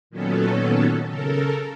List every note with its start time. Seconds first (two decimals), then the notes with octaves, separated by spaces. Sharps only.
0.10 A#2 D#3 F#3 B3 C#4 A4
1.09 C#3 A4 A#4